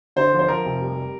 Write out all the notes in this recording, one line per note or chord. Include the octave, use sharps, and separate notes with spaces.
D3 C5
F3
C5
F3 A#4
F1
G3
G3